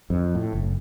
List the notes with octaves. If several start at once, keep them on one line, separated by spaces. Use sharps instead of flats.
F2
A2
F#1